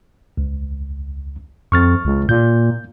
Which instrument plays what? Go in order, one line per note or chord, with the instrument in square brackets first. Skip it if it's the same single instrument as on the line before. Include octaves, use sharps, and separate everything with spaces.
[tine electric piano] C#2
[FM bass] F2 [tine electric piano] C#6 F6 A6
[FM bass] C#2
[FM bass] A#2 [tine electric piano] G6